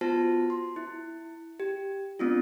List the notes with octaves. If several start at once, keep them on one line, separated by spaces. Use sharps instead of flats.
B3 F4 F#4 C5 A5
C6
E4
G4
A3 B3 C4 D4 F4